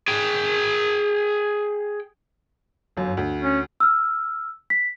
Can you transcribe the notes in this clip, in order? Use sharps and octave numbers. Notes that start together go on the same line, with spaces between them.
G#4 G5
G1 F#2
D2
C#4
E6 F6
B6